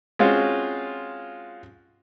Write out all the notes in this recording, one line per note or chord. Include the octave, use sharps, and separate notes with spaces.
G#3 C4 C#4 F4 F#4